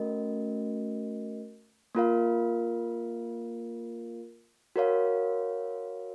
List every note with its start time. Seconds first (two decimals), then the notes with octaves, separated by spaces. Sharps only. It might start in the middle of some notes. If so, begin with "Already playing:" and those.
Already playing: A3 C#4 F#4 A#4 D#5
1.95 A#3 F4 A#4 F5
4.76 F#4 A#4 C#5 F5